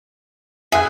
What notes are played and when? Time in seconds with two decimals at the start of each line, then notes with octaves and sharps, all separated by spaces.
0.72 G#4 E5 F#6